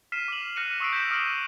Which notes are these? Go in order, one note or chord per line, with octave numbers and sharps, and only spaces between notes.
F6 B6 C7 D#7 E7
D6 F#7
F6 F#6 A#6 C#7 D#7
C#6 D#6 E6 B6 C7 D7
G6 A#6 B6 D7 E7
D6 D#6 F6 D7 D#7 F#7